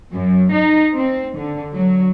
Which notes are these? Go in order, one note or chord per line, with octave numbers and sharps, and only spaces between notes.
F#2
D#4
C4
D3
F#3